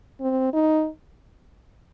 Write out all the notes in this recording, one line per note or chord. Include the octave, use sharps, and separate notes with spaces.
C4
D#4